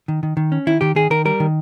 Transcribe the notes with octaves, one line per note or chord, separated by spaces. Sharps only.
D#3
D#3
D#3
C#4
D#3 E4
D#3 G4
D#3 G#4
D#3 A#4
G3 A#4
D#3